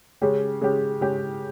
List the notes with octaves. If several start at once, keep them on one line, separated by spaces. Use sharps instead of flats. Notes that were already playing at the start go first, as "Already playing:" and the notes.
C#3 G#3 C#4 G4
C#3 G#3 C#4 G4
C#3 G#3 C#4 G4